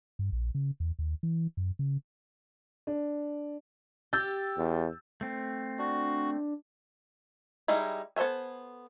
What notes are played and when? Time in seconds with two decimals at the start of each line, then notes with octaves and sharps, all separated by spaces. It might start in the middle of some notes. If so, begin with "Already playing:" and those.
0.19 G2
0.32 A#1
0.55 C#3
0.80 E2
0.99 D#2
1.23 E3
1.57 F#2
1.79 C#3
2.87 D4
4.13 G4 E6 G6 A6
4.58 E2
5.21 A3 C4
5.79 D4 F#4
7.68 G3 G#3 D#4 E4
8.16 B3 A4 C5 E5 G#5